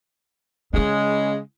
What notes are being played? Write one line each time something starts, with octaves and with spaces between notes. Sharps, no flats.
C#3 G#3 D#4 E4